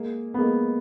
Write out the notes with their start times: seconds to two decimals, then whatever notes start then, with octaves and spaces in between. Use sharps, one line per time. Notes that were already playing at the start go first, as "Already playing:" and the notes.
Already playing: G#3 A#3
0.34 B3
0.39 G#3 A#3